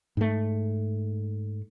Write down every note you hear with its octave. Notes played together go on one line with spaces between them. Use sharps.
G#2 A3